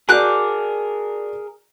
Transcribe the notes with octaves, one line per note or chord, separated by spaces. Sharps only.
F#4 G#4 A#4 D5 D6 F#6 G6